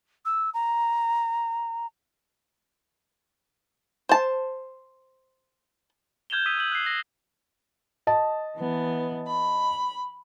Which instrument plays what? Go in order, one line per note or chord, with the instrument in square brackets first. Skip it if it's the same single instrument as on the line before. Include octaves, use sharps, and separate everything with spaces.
[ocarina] E6
A#5
[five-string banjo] C5 A5
[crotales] F6 G6 G#6 E7 F7 G7
D#6 E6 B6 D#7 F7
E6 G6 F#7
F#6 C7
A#6
[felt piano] D#5 A5
[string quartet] E3 B3
B5